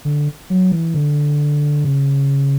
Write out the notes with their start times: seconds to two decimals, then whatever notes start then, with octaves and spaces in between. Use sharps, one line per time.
0.05 D3
0.50 F#3
0.72 E3
0.94 D3
1.84 C#3